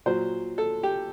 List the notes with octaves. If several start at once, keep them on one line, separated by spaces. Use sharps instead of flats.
A#2 F#3 C5
A4
G4